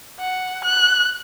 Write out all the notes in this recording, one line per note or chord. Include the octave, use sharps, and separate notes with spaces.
F#5
F#6